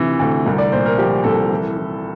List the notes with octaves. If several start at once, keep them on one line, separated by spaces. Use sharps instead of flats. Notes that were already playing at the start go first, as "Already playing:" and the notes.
Already playing: D2 C3 E3
D2
C2
D5
A#2 C5
A#4
F3 G4
C2 A4
E3
E3